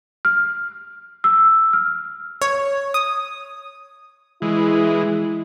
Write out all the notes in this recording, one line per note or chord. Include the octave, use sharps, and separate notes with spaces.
F6
E6
F6
C#5
D#6
E3 G#3 E4